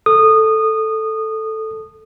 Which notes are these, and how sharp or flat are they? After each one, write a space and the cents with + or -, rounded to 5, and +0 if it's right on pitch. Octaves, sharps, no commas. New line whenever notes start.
A4 +0 D#6 -20